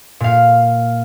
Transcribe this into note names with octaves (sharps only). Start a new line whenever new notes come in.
A#2 F5